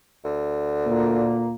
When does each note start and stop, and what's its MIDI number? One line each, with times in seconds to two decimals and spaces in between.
0.24 1.50 38
0.86 1.55 46
0.86 1.55 58